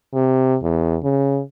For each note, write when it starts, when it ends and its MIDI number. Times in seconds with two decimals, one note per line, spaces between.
0.14 0.56 48
0.63 0.96 40
1.04 1.40 49